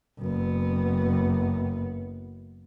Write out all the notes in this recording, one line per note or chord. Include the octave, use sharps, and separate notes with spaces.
F#1 B3